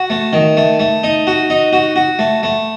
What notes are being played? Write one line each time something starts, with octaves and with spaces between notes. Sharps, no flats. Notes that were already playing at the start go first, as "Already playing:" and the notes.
Already playing: F#4
A3
D#3
A3
A3
D#4
F#4
D#4
F#4
F#4
A3
A3